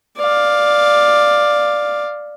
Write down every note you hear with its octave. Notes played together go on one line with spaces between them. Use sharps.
D5 F5